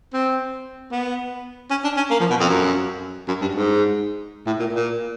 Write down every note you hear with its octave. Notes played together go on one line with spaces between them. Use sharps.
C4
B3
C#4
D4
C#4
A#3
F3
B2
F2
F#2
F#2
G2
G#2
A2
A#2
A#2